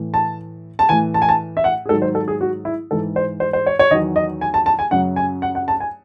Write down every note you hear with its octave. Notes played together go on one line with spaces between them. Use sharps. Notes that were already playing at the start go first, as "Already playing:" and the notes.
Already playing: A2 E3
A5
A5
A2 E3 G#5
A5
G#5
A5
E5
F#5
G#4
G#2 D#3 F#3 A4
C5
A4
G#4
F#4
E4
G#2 E3 A4
C5
C5
C5
C#5
C#5
E2 D#3 F#3 D#5
D#5
G#5
A5
A5
G#5
F#2 C#3 F#3 F#5
G#5
F#5
F#5
A5
G#5